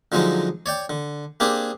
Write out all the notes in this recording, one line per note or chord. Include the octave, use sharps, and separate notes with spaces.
D3 F3 F#3 G#3 D#4
C#5 D5 G5
D3
A#3 C4 D4 G4 G#4